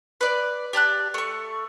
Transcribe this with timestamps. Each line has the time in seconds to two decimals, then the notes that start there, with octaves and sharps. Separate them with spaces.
0.21 B4 D5
0.73 G4 D5 A5 F#6
1.14 A3 C#6